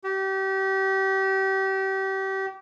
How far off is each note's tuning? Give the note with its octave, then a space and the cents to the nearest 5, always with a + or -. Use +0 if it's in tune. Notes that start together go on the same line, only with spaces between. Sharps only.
G4 -30